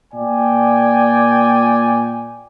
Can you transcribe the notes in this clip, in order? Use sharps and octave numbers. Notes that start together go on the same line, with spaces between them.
A#2 D5 G5 G#5